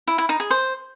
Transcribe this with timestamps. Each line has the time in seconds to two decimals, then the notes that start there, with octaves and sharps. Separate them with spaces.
0.07 E4
0.18 E4
0.29 D#4
0.40 G#4
0.51 C5